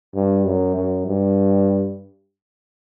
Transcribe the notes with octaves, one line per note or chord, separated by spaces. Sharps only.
G2
F#2
F#2
G2